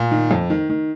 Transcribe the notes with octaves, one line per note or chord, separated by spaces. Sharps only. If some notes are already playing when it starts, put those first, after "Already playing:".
Already playing: A#2
D#3
F2
D#3
D#3